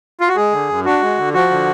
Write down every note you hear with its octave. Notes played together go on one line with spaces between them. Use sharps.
F4
F#4
G#3 G#4
D3
F#2
D4 F#4
G#3
D3
F3 F#4
D3